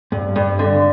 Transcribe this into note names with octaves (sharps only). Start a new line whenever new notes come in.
G2
G2
D3